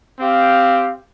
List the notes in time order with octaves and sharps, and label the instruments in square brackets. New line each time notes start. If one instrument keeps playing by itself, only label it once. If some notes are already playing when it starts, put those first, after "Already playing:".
[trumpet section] C4 G4 F5